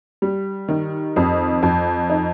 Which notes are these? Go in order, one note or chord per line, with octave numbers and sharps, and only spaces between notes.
G3
D#3
F2
F2
D#4